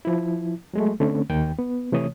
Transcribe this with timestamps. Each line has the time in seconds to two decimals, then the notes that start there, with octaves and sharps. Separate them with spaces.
0.05 F3 E4
0.74 F#3 G#3 A3
1.00 D3 A3 C4 C#4
1.30 D#2 D#3 G5
1.59 B3
1.92 C3 E3 A3 C#5 D#6